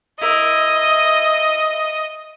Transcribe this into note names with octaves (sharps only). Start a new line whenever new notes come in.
E4 A#4 D#5 E5